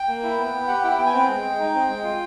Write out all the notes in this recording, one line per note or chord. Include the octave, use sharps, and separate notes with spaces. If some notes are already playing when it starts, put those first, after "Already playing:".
Already playing: G5
A#3
E4
B3
B3
G4 F#5
E4 G5
B3 G5
G#5
C4 G5
G#3
G#3
D#4
C4
G#3
F4